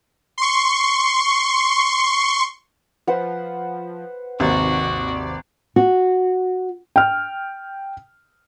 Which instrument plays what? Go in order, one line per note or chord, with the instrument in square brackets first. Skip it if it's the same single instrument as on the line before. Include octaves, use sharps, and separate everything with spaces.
[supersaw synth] C6 C#6
[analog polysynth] F3 [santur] B4 C5 F#5
[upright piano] G#1 [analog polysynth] D#2 C3 D5 [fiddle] F#4
[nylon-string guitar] F#4
[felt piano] G5 F6